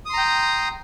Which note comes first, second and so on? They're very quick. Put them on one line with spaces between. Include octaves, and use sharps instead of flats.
D#6 C6 A#5 G5